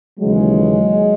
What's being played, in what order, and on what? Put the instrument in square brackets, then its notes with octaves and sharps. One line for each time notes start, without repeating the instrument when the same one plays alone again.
[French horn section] D#2 C#3 E3 F#3 G#3